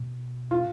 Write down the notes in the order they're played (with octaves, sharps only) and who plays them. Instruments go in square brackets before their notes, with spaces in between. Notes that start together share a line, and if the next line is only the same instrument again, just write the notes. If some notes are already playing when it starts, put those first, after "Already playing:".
Already playing: [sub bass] B2
[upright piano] F4